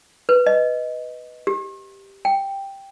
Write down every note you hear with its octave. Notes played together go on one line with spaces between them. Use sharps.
B4
D#5
G4
G5